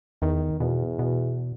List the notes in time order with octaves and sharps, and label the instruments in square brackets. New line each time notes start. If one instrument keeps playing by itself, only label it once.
[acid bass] E2 [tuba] D#3
[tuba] E2 [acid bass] B2
[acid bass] B2